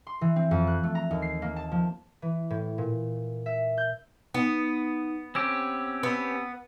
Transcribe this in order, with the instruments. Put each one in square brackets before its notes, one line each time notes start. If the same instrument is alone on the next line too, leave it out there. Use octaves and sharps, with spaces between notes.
[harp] C6
E3
C4
F2
F#6
A3
A#5
D#2
C7
A#3
A5
F3
E3
A2
A#2
E5
G6
[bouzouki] B3 [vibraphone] D#4
[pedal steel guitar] C4 C#4 G4 [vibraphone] E6
[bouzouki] B3